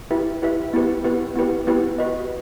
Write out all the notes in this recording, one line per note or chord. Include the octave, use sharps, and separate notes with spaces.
E4 G4 B4 E5
E4 G4 B4 E5
B3 E4 G4 B4
B3 E4 G4 B4
B3 E4 G4 B4
B3 E4 G4 B4
F#4 B4 D#5